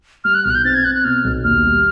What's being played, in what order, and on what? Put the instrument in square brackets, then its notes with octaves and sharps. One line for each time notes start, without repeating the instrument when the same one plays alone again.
[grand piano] G3 [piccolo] F6
[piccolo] F#6
[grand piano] B1 [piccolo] F6
[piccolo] F#6
G6
[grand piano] C4 [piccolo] A6
[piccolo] G#6
[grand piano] C4 [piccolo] F#6
[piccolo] F#6
[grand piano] B2 [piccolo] F6
[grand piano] B1
[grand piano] D#2 [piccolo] F6
[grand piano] G3